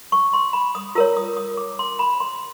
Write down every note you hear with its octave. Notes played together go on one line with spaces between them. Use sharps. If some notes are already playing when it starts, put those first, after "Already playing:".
C#6
C6
B5
D#6
F4 A#4 C#5 E6
D#6
D#6
D6
C6
B5
C6